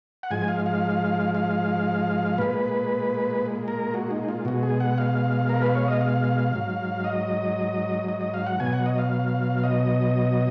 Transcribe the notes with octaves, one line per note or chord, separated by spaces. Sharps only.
F#5
G#2 F3 G#3 G#5
F5
F5
F5
A#2 G#3 B4
A#4
F#4
D#4
F4
B2 G#3 F#4
G#4
F#5
F5
A#4
B4
C#5
D#5
F5
G#2 F#3
D#5
D#5
D#5
F5
F#5
B2 F#3 G#5
F#5
D#5
F5
D#5